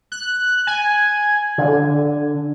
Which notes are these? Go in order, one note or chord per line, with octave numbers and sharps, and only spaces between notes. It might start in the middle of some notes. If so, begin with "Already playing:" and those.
F#6
G#5
D3